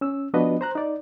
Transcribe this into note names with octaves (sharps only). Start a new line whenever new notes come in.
C#4 E6
F3 B3 D4 F#4 B4 D#5
C5 A#5 F#6
D#4 D5